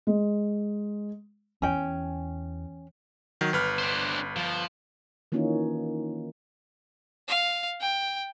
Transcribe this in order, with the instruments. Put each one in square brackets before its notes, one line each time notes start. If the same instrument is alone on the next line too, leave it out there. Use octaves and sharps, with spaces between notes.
[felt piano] G#3
[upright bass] E2 [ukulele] C#4 G5
[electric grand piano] D#3 F#3
G1 B4 F6
[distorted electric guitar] D4 C5
F3
[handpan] D#3 E3 A#3 C#4 D#4 F4
[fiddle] F5
G5